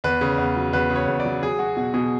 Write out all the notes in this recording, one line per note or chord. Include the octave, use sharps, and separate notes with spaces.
E2 B4
C#3
E2
F#3
E2 B4
C#3
C#5
E2
D5
F#3
F#3 G#4
F#3 F#4
B2 F#4
B2 G#4